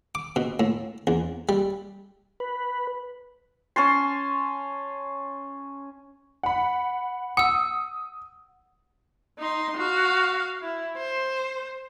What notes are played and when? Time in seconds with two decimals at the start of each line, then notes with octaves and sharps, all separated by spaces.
0.15 D6
0.36 B2
0.60 A2
1.07 E2
1.49 G3
2.40 B4
3.76 C#4 A5 C6
6.43 F#5 B5
7.37 F#5 D#6 E6
9.39 D#4 C6
9.77 F#4 F5
10.62 E4
10.98 C5